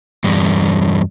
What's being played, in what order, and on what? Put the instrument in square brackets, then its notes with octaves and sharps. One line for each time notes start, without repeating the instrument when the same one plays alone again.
[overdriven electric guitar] E2 G2